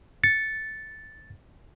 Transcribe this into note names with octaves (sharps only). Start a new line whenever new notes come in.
A6 C#7